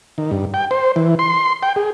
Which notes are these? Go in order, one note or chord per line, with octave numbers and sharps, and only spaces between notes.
D#3
G2
G5
C5
E3
C6
G5
G#4